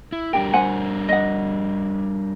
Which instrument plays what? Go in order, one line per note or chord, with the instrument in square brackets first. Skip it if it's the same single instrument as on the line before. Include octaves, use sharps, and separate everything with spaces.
[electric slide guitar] E4
[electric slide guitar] G3 D4 A#4 [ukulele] G4 G5
[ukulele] C5 F#5 G#5
D#5 F#5